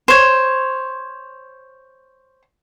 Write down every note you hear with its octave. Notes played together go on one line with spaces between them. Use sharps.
C5 C#5